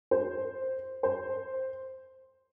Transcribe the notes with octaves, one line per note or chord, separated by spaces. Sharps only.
C5
C5